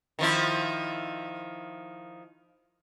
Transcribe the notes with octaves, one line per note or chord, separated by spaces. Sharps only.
D#3 F3 E4